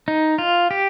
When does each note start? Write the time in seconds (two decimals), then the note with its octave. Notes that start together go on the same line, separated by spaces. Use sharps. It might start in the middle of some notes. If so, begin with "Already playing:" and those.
0.08 D#4
0.38 F4
0.71 G4